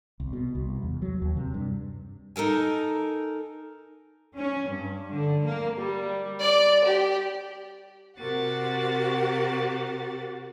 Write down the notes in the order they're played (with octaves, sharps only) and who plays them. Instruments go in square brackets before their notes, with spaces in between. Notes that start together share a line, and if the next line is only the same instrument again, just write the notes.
[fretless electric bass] C2
B2
C2
E2
F#3
D#2
C3
G2
[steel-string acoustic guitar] D#4 A4 A#4 G#5
[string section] C#4
G2
D3
A#3
G3
D5
G4
[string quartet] C3 F#4 G4 A#4 F#5 A6